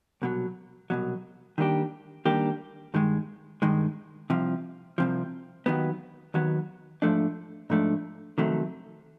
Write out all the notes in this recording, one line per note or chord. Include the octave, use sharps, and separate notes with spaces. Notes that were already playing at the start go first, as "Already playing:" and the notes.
C2 B2 F#3
C2 B2 F#3
D#3 G3 A#3 D4 G4
D#3 G3 A#3 D4 G4
G2 D#3 G#3
G2 D#3 G#3
C2 C3 F3
C2 C3 F3
D#2 D#3 F#3 B3
D#2 D#3 F#3 B3
G#2 F3 A3 D4
G#2 F3 A3 D4
F2 C3 D#3 F#3 A3